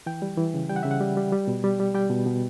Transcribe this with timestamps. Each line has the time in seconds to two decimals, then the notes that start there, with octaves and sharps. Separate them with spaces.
0.06 E3 G5
0.22 G3
0.38 E3
0.54 C#3
0.69 G3 G5
0.76 F#5
0.83 C#3 E5
0.91 F#5
1.01 G3
1.17 G3
1.32 G3
1.48 B2
1.64 G3
1.80 G3
1.94 G3 G5
2.10 B2
2.26 B2